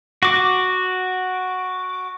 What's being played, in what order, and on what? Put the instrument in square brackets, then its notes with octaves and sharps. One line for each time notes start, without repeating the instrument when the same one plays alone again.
[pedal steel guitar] F#4 D6